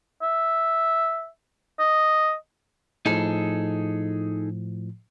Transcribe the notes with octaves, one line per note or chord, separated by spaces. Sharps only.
E5
D#5
A2 F3 D#4 G#4 A4